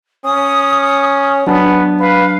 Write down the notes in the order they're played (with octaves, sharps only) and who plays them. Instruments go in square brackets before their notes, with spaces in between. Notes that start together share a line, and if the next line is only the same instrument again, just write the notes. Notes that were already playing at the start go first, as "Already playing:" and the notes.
[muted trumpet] C#4 [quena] D#6
[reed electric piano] F#3 D4 A5 [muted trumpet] B3
[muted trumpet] B4 [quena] F5